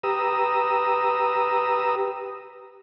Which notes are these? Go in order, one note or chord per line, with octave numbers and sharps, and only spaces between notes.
G4 B4 A#5 D#6 E6